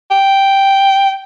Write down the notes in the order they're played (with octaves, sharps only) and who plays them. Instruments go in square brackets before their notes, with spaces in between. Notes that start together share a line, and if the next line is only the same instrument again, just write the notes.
[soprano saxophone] G5